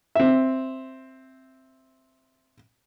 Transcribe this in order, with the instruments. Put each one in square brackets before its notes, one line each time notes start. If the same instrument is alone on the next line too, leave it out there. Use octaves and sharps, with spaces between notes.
[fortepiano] C4 E5